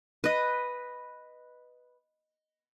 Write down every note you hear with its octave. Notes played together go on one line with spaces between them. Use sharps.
B4 D#5